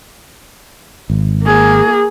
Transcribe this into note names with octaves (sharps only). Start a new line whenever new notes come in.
G#1
A#3 G#4